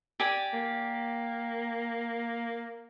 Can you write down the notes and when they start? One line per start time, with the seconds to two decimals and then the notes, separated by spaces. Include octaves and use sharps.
0.20 G4 D5 G#5
0.53 A#3